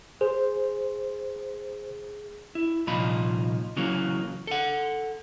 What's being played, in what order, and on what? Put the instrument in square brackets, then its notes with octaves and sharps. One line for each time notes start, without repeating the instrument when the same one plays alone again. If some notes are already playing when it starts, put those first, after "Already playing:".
[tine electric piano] G#4 [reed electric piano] C5
[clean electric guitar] E4
C2 A#2 F3 D#4 B5
C#3 E3 F#3 A#3
A4 F#5